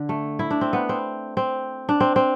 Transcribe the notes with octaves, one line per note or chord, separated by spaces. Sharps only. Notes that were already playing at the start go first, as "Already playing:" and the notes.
Already playing: D3
A3
E4
D4
C4
B3
C4
C4
D4
C4
C4